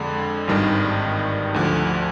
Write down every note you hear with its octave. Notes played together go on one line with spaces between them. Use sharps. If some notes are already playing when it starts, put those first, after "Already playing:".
Already playing: F2 D3 G#3
G#1 G2 D#3 G3 D4
D2 D3 F3